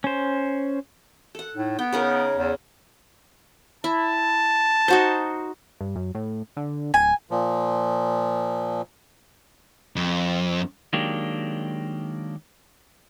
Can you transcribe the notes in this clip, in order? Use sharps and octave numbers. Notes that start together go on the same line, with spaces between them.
C#4 C5
A4 F#5
A2 D#4
B3 G5
C#3 D#4 A#4 C#5
E2
E4 A5
D#4 F#4 C5
G2
F#2
A2
D3
D1 G#5
A#2 F3
F2
D#3 F#3 G#3 A#3 D4 G4